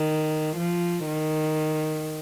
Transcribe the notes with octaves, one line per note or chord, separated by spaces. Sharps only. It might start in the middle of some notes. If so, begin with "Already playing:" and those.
Already playing: D#3
F3
D#3